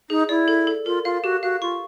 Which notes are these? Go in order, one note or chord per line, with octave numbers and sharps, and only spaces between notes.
D#4 G#4
E4 D5
A4
A4
F4 A#4
F4 F5
F#4 G4
F#4 F5
F4 C#6